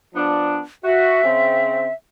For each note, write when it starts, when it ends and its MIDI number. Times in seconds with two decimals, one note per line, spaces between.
0.15 0.60 53
0.15 0.60 59
0.15 0.60 62
0.85 1.21 66
0.85 1.92 76
1.23 1.88 49
1.23 1.88 60